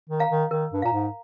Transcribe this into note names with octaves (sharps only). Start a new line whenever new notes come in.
D#3
F5 A#5
D#3
D#3 A#4
G2
A#2 F5 A#5
G#2